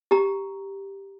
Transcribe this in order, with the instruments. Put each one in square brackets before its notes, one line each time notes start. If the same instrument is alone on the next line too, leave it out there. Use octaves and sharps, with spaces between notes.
[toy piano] G4 A#5